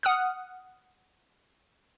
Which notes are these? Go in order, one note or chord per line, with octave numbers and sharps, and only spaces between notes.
F#5 D#6 F6 F#6